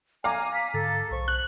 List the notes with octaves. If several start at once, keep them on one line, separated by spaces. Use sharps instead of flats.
F5 G#5 A#5 D6
B6
G#2 D3 A4 A6
B1 C5 C#6
F#6